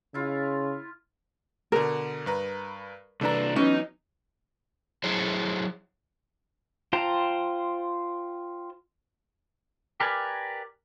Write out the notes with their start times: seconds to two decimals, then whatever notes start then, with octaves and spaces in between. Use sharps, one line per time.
0.14 C#3 E4 F4
1.72 B2 D3 A#4
2.26 G2 B4 A#5
3.21 C2 D4 A4 B4 A#5
3.56 E3 F#3 B3 C#4 D#4
5.04 F#3 E4 G#4 C5 C#5
6.93 F4 C5 G5 A5 A#5
10.00 G4 A#4 B4 D5 G#5